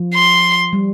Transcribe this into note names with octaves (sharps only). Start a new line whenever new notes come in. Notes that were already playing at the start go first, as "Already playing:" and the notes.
Already playing: F3
C6
G3